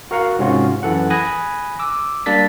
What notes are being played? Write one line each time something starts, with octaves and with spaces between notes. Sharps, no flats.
F#4 A#4 F5 F#5
G#2 C3 C#4 F4 F#4
F#2 E3 A4 F#5
G#5 B5 D#6 F#6 A#6
D6 E6
G3 A#3 D4 A6 B6